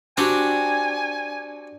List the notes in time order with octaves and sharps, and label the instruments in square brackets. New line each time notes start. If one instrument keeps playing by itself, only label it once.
[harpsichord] C4 F#4 G4 [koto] D4 [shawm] G#5